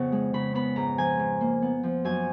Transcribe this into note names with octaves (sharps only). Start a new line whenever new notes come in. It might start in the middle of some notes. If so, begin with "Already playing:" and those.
Already playing: F2 C#3 B3
G#3
C#3 B5
B3 B5
G#2 A#5
F3 G#5
G#2
A#3
B3
F3
F#2 G#5